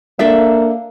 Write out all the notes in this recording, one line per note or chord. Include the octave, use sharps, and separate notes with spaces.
A#3 D4 A4 E5